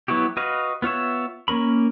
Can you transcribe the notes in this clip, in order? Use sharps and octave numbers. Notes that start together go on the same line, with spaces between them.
F#3 B3 E4 F#4 G4
F#4 B4 D#5 F5
B3 F4 C#5 E5
A#3 C#4 A#4 B5